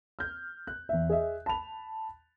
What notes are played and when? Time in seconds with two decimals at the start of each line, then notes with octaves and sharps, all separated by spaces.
0.19 F6 G6
0.67 F#6
0.89 E2 E5
1.10 G#4 D#5 E5
1.46 A5 B5 F7